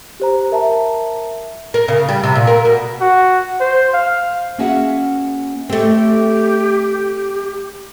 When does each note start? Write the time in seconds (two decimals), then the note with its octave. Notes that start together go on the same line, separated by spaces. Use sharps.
0.20 G4 C5 A#5
0.51 A#4 E5 A5 A#5
1.74 A#4
1.88 C#3
2.09 G3
2.24 C3
2.35 A#2
2.47 A#4
2.65 B2
3.00 F#4
3.60 C5
3.93 F5
4.59 A#3 C#4 F#4 G#4 E5 F#5
5.69 A3 C4 G4